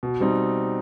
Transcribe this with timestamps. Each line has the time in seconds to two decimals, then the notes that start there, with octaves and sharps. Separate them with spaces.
0.03 B2
0.21 G3 C4 D#4